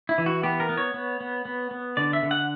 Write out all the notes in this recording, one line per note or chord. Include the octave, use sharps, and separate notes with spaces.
E4
E3
F#4
B3 G4
A#4
B3
C#5
B3
B3
B3
B3
D3 D5
E5
D3
F#5